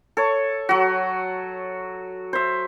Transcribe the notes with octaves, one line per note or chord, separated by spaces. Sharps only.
A4 C#5
F#3 F#4
C5 E5